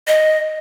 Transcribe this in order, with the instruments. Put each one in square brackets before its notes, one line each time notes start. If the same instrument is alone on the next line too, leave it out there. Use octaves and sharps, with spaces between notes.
[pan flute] D#5